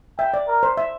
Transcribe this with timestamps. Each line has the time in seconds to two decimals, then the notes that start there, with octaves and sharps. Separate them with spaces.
0.18 E5 G5
0.34 D5
0.48 A#4
0.63 C5
0.77 E5